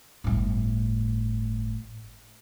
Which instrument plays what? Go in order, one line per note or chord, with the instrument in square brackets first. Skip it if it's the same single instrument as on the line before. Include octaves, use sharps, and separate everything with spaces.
[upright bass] G1 A2